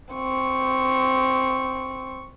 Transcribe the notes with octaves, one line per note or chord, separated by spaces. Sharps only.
C4 C#6